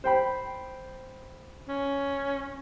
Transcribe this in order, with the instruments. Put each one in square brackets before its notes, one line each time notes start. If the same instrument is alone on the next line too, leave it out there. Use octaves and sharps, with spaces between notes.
[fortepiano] C5 G5 B5
[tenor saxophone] C#4